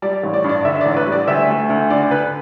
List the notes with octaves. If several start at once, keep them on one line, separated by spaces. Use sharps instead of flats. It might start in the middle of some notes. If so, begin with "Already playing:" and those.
G3 D5
A1
D5
G2
D5
D3 E5
D5
A1
B4
G3
D5
D2 E5
A3
D2
D3 D5
D3 B4